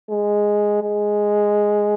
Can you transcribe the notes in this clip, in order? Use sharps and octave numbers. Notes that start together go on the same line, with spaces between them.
G#3
G#3